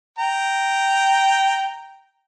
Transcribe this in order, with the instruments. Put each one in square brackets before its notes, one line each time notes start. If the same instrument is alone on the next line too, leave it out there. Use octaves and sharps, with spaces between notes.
[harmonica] G5 A#5